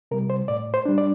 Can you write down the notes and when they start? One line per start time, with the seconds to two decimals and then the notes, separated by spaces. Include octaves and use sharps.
0.11 C3 G3 A#4
0.30 C5
0.48 A2 D5
0.74 C5
0.86 G3 D4
0.98 D5